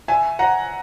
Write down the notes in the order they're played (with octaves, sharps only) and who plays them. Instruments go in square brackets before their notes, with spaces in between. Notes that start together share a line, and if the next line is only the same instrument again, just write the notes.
[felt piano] E5 G#5
F#5 A#5